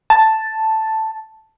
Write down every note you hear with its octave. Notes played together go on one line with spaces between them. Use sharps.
A5